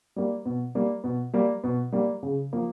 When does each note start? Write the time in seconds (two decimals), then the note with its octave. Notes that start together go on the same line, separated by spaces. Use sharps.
0.16 G3 A#3
0.46 B2
0.75 G3 A#3
1.04 B2
1.33 G3 A#3
1.64 B2
1.92 G3 A#3
2.23 C#3
2.53 F3 A#3